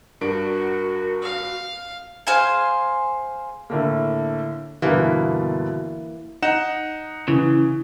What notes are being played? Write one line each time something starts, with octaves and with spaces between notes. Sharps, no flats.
G2 D4 F#4 A#4 D7
F5
G#4 C5 F5 G#5
A2 D3 A#3
G1 B2 D3 E3 A#3
D#4 F#5 E7
C#3 E3